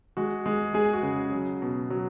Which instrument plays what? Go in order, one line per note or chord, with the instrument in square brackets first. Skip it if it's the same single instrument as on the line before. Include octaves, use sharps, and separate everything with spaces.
[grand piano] G#3 F#4
G#3
G#3 G#4
F#4
C#3
F#3
B2
F#3